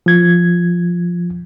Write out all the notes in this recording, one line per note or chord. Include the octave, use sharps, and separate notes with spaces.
F3 G#6